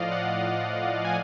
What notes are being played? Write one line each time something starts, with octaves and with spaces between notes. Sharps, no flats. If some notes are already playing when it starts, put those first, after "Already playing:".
Already playing: A2 F3 D5 D#5 F5
F#5
G#5